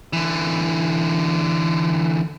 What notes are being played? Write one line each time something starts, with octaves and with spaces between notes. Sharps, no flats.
D3 E3